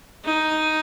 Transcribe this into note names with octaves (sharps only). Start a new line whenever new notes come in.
D#4